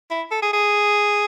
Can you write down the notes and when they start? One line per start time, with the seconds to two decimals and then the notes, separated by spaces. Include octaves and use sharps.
0.11 E4
0.31 A4
0.42 G#4
0.53 G#4